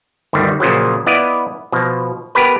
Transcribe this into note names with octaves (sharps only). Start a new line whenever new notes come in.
G1 D2 D#3 G3
A#2 C#3 F3 F#3
B3 E4 D5 D#5 F5
B2 F3
B3 G4 A#4 B4